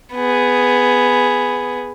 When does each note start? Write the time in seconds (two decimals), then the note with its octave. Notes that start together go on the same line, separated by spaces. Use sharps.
0.14 B3 G#4